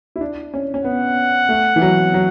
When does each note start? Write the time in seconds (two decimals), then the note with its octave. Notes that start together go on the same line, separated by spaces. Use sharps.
0.16 E4
0.21 D4
0.54 C#4
0.74 C#4
0.85 B3 F#5
1.49 A3
1.76 E3
1.82 F#3
2.14 F#3